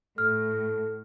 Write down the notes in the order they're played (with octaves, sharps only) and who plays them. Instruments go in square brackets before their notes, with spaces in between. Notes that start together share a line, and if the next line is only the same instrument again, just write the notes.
[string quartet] A2 [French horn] A4 [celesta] F6